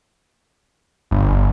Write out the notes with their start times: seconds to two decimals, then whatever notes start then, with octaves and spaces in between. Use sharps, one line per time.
1.11 G1